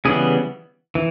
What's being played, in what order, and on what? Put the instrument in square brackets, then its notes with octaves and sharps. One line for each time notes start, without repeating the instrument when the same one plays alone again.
[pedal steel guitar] C#3 E3 G3 B3 G#4
E3